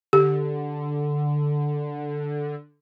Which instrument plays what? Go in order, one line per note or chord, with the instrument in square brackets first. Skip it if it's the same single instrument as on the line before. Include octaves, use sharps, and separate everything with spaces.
[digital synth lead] D3 [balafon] G4